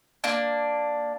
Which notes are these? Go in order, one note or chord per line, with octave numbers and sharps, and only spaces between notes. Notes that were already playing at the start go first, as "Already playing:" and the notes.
A#3 D4